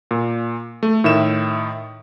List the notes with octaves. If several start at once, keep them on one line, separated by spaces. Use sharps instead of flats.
A#2
A3
A2 D#3 E5 E7